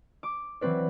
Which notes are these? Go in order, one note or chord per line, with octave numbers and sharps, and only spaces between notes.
D6
E3 F#3 C4 B4 D5